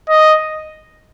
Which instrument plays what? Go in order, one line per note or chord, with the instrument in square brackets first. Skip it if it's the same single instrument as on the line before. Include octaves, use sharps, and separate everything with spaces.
[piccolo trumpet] D#5